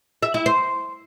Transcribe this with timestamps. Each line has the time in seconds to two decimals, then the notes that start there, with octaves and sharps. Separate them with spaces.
0.23 E5
0.34 E4
0.46 C5